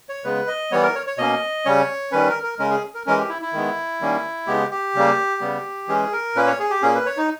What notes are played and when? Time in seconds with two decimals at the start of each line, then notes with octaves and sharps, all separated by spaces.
0.09 C#5
0.24 C#3 G#3 B3 B4
0.47 D#5
0.71 E3 G3 B3 C#5
0.83 A#4
0.95 C#5
1.07 C#5
1.18 B2 A#3 C#4 D#5
1.66 C#3 G3 C#4 C#5
2.12 D#3 G3 C#4 B4
2.29 A#4
2.43 A#4
2.59 C#3 G#3 C#4 A#4
2.70 G#4
2.94 A#4
3.06 E3 G#3 C#4 A#4
3.18 G4
3.29 E4
3.42 E4
3.53 D#3 G#3 B3
4.01 D#3 G3 A#3 C#4
4.47 C#3 G#3 B3 G4
4.71 G4
4.95 C#3 G3 A#3
5.41 C#3 G3 B3
5.88 E3 G#3 C#4 G#4
6.13 A#4
6.36 A#2 A#3 C#4 B4
6.47 C#5
6.59 G#4
6.70 G4
6.82 A#2 A#3 C#4 G#4
6.95 B4
7.06 C#5
7.17 D#4